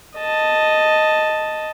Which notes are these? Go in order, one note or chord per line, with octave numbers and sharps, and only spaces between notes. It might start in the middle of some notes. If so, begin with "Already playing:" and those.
D#5 A5